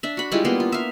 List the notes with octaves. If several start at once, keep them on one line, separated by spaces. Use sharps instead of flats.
D4 E5
F#4 B5
G3 G#3 E4 F4
A#3 B3 C6
F4
E5 F5